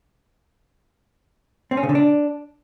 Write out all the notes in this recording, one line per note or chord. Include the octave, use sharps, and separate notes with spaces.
C4
C#4
C#3
D3
D4